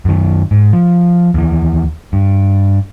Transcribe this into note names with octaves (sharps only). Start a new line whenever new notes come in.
F#2 D#3
G#2
F3
D#2 E3
G2